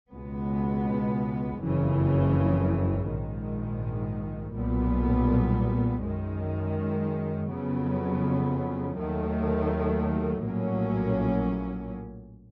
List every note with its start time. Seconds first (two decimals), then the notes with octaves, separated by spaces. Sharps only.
0.12 C#2 B2 G#3 B3
1.60 F#1 F2 C#3 E3
3.07 A#1 G#2 D#3
4.54 B1 A#2 G3 B3
6.02 F#2 D#3 G#3
7.50 F2 C#3 F#3 B3
8.97 D#2 D#3 F#3 A3
10.44 A#1 A2 F#3 A#3 C#4